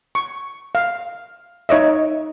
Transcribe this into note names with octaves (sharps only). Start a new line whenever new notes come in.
C#6
F5
D#4 C#5 D#5 E5